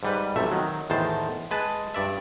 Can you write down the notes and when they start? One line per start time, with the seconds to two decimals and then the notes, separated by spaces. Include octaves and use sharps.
0.03 G#2 G3 B4
0.36 B1 C3 A3 E5
0.51 D#3 F#3
0.90 E2 A2 D#3 C5 A5
1.51 G#3 B4 A5
1.94 G2 D5 E5